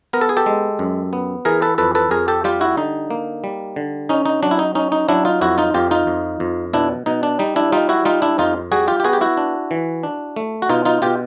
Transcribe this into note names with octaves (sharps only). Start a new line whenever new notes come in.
B3 A#4
A4
G#4
G4 A4
G#3
F#2
B3
E3 G#4 A#4
A4 B4
F2 A4 B4
A4 B4
F2 G#4 A#4
G4 A4
G3 F4 G4
E4 F#4
D3 D#4
A#3
G3
D3
C#4 D#4
D#4
F#3 D4
E4
D#4
C#4 D#4
D#4
F#3 D4 E4
D#4 F4
F2 E4 F#4
D#4 F4
F2 F4 G4
D#4 F4
F2
F2
B2 D4 E4
B2 D#4
D4
G3 D#4
D4 E4
G3 D#4 F4
E4 F#4
G3 D#4 F4
D4 E4
F2 D#4 F4
G3 F#4 G#4
F4 G4
G4
B3 F#4 G#4
G4
E4 F#4
D4
E3
D4
A3
F#4
B2 D#4 F4
D#4 F4
B2 F4 G4